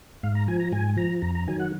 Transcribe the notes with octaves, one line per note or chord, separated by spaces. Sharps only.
G#2 F5
A#5
F3 G#5
A#5
G#2 G#5
F3 A#5
F2 A#5
A#5
D#3 F#3 G#5
F#5